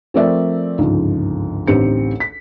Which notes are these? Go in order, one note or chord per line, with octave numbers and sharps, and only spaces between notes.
F3 A3 C4 A#4 D5 E5
G1 C#2 G#2 F3
A1 D2 C4 D#4 G4 C#7
B6